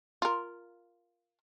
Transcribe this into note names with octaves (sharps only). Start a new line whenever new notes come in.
F4 A#4